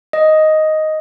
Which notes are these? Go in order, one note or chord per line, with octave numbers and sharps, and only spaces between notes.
D#5